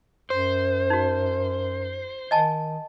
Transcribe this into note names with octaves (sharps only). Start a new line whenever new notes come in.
F#2 C5
D#4 F#4
D#3 D#5 G#5 A5